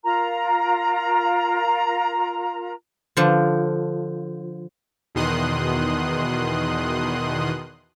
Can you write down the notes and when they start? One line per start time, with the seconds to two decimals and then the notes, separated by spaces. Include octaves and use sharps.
0.04 F4 A#4 A#5
3.17 D3 F3
5.15 E2 B2 D#3 C6 D#6 F#6